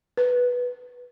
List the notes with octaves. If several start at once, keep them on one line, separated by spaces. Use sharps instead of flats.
B4